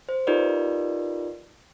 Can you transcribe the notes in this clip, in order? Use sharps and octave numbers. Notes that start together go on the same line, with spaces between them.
C5
D#4 F4 G4 A#4 B4 D5